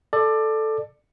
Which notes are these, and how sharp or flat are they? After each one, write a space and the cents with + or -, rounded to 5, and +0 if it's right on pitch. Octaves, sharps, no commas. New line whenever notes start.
A4 +0 D5 +20